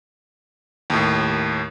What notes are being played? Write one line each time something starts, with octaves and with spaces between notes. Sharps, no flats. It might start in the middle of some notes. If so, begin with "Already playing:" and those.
D#2 A2